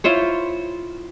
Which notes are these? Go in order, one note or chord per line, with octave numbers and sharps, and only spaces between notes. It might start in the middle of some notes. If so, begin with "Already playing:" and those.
E4 F4 C5 C#5